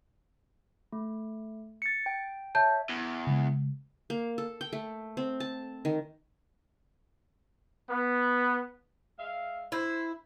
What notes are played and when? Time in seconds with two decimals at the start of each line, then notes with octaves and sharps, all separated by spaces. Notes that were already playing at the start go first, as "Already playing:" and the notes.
0.92 A3
1.82 A6 C#7
2.06 G5
2.55 C#5 E5 A5 G6
2.89 E2
3.27 C#3 G#3
4.10 A#3
4.38 A4
4.61 G5
4.73 A3
5.17 C4
5.40 A5
5.85 D#3
7.89 B3
9.19 G#3 E5 F5
9.72 E4 C5